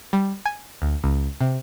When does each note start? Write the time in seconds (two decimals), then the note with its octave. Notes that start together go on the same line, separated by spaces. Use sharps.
0.13 G3
0.45 G#5
0.82 D2
1.04 C#2
1.41 C3